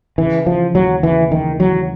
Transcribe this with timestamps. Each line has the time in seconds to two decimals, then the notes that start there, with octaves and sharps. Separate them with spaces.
0.18 C#3 E3
0.46 E3 F3
0.75 D#2 F#3
1.03 C#3 E3
1.31 D#3 E3
1.60 E3 F#3